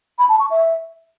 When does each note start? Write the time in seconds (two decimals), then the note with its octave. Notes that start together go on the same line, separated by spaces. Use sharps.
0.18 B5
0.29 A5
0.40 C#6
0.50 E5